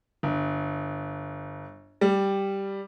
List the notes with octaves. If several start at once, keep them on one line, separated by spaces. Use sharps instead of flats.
G1
G3